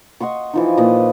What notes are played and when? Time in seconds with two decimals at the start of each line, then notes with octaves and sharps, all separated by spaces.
0.20 D#5 F#5 C6 C#6
0.54 E3 F3 D#4
0.78 A#2 B4 D#5